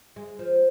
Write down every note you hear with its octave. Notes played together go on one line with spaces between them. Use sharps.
G#3
F3